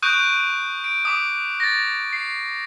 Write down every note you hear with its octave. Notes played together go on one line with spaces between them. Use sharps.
C#6 D#6 F#6 G6 D7 D#7
D7
D6 D#6
A6 A#6
C7